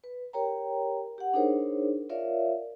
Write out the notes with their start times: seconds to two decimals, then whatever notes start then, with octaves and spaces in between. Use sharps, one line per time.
0.04 B4
0.33 G4 A#4 C#5 G5 A#5
1.18 G4 F#5
1.33 D4 D#4 G#4 A#4 C5 C#5
2.09 F4 A#4 C#5 D5 E5 F5